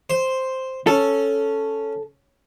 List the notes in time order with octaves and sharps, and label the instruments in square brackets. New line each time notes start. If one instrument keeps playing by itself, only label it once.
[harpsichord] C5
[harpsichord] C#4 [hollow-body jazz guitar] A4